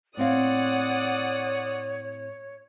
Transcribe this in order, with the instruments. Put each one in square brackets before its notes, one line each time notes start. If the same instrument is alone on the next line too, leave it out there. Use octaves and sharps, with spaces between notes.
[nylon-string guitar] A2 C4 F5 [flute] C#5 [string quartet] D5 F#5 D#6